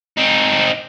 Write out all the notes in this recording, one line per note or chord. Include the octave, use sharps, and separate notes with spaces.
C4 D#4